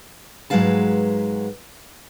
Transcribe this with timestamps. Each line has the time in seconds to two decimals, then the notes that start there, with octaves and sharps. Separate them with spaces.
0.50 G#2 F#3 G#3 B4 F5 A5